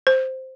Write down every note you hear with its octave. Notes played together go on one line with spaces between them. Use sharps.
C5